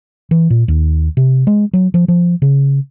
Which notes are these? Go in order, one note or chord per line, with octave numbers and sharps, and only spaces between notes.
E3
A#2
D#2
C3
G#3
F#3
F3
F3
C#3